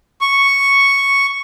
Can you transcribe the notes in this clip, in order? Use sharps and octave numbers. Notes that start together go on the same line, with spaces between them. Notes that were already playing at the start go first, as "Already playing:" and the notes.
C#6